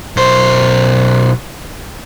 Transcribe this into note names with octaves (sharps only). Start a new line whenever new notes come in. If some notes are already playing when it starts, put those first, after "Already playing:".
B1 C5